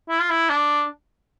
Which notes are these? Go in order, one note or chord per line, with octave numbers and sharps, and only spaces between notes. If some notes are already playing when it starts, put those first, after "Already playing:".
E4
F4
E4
D4